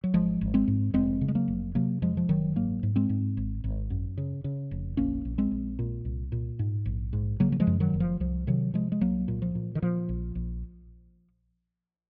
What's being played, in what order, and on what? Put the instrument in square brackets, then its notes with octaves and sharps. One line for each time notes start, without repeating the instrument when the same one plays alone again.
[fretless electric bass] F#3
G#1 F3 G#3
G#1
G#3 C4
G#2
F1 G#3 C4
C#3
G#3
F#3 A#3
F1
C3 F#3 A#3
F2 F3 G#3
F3
F#1 D#3 F#3
G#2 F#3 A#3
G#2
G#3 C4
G#2
G#1
G#1
F#2
C#3
C#3
F1
A#1 A#3 C#4
A#1
G#3 C4
A#1
A#2
C2
A#2
G#2
A#1
G#2
C#3 F#3 A#3
F#3
F3 G#3
F#2
D#3 F#3
F#1
F3
C2 F3
C3 D#3 F#3
C3 F3 G#3
G#3
C2 F#3 A#3
A#2
F3
A#2
D#3
A#2 F3
A#1
A#1